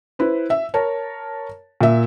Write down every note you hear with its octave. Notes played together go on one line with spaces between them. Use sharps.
E4 B4 C5
E5
A#4 C#5 A5
A#2 E5